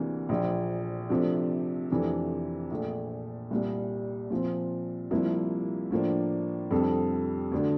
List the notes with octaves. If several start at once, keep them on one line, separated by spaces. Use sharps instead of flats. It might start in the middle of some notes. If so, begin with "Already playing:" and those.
Already playing: D2 C3 E3 A#3 D4
A#1 A#2 F3
C3 F3 A3 D4 G4
F2 C3 E3 A3 D4
A#1 A#2 A3
C2 A#2 G3
A#2 F3 C4
C2 C3 F3 A#3 E4
A2 F3 A#3 D4
F2 C3 G3 D4 A4
D2 D3 A3 D4